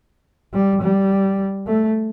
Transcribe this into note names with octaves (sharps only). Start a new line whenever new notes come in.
G3
G3
A3